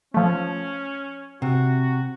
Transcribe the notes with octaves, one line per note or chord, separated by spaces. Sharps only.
F3 A3 C#4
C3 F#4